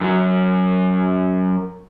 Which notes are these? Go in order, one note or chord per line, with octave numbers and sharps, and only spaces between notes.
F#2 F#3